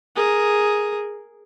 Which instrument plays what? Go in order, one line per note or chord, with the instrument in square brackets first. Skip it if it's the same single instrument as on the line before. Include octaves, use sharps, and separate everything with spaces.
[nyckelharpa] G#4 A#4